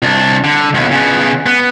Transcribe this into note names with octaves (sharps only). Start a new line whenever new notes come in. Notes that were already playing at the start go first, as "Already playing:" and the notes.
C2 D4
D3
D#2 B2
C#3 B3
B3